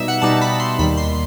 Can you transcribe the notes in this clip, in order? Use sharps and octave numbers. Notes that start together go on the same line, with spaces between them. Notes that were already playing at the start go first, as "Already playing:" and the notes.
Already playing: B2 G3 D#4 E5
F#5
B2 G3 D#4 A5
B5
C6
D#2 D#3 G3 B5
C6